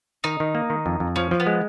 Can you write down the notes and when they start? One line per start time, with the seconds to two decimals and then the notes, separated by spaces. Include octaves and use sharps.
0.24 D#3 D#4
0.40 D#3
0.55 A#3
0.70 D#3
0.86 F2
1.00 F2
1.16 F3 C#4
1.31 F3
1.40 B3
1.47 G#3